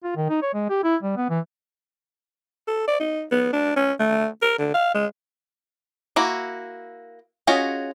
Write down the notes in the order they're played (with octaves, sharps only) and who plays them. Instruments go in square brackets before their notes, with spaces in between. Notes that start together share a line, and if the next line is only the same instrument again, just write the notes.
[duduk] F4
D#3
D#4
C#5
G#3
G4
E4
G3
B3
E3
[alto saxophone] A4
D5
D#4
B3
D4
C#4
A3
A#4
D3
F5
G#3
[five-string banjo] A#3 E4 F#4
C#4 F4 F#4 G#4 D#5